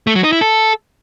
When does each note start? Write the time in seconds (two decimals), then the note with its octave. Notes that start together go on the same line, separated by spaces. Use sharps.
0.07 A3
0.15 F#3
0.24 D#4
0.33 E4
0.41 A4